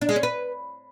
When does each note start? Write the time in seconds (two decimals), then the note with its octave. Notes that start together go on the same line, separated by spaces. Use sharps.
0.01 D4
0.09 G#3
0.16 C#4
0.23 B4